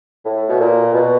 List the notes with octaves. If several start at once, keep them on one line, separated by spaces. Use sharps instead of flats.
A2
B2
A#2
B2